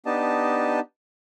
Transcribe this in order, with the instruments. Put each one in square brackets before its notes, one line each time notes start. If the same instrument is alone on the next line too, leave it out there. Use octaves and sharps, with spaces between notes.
[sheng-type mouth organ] B3 D4 D#4 G4 D#5 A5